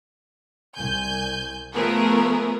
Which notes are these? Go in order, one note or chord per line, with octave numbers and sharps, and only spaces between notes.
C2 G#5 G6
F3 A3 B3 G#4 A#4